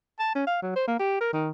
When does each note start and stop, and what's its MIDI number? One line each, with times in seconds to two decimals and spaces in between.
0.19 0.34 81
0.35 0.45 61
0.47 0.58 77
0.62 0.75 54
0.76 0.84 72
0.88 0.97 58
1.00 1.18 67
1.21 1.28 70
1.33 1.50 51